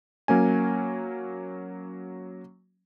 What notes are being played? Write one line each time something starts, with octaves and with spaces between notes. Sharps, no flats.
F#3 A#3 C#4 G#5